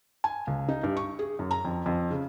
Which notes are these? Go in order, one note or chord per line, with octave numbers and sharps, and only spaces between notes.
G#5
C#2
D#4
G2
C#6
G#4
F#2
A#5
F2
F2
C#3